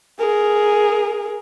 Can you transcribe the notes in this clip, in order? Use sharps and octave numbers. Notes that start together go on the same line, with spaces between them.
G#4 A#4